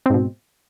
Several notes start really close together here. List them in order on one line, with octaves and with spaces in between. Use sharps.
C4 G#2 B2